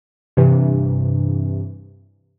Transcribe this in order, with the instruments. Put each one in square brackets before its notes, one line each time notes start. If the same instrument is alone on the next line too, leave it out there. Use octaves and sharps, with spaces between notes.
[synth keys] G2 C3 E3